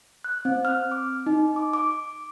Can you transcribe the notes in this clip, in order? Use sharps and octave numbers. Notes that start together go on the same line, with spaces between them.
F#6
C4
F6
D6
D#4
D6
D6